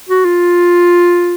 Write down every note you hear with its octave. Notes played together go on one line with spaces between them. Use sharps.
F#4
F4